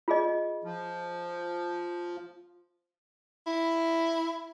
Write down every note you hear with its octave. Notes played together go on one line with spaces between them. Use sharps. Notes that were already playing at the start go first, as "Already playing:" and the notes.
F4 G#4 D#5
F3
E4